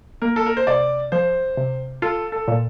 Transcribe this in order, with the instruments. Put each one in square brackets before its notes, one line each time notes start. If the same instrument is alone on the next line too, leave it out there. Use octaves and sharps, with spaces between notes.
[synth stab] A#3 [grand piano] A#4
[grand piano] A4
A#4
C5
[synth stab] C3 [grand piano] D5
[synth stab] F3 [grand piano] C5
[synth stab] C3
[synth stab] F4 [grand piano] A4
[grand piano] A4
[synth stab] A#2